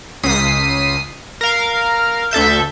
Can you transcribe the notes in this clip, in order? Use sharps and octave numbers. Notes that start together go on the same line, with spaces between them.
C#2 D#6 B6 C7
A#4 F5
D2 A4 E5 G6